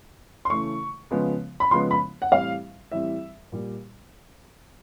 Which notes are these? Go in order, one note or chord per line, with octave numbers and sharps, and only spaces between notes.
C6
C#3 E3 A3 C#6
C#3 F3 G#3 B3
B5
C#3 F3 G#3 B3 C6
B5
F#5
A2 E3 G3 C4 F5
A2 E3 G3 C4 E5
A#2 G3